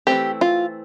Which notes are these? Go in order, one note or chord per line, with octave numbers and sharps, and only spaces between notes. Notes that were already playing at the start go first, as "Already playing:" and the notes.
E3 A3 C4 G4
F4